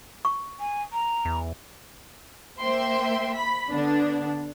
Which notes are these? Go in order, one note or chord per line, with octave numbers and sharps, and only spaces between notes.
C#6
G#5
A#5
E2
A#3 C5 E5 G5 C6
B5 B6
D3 B3 D4